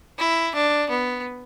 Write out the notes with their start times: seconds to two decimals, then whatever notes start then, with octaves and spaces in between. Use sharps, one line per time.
0.18 E4
0.55 D4
0.90 B3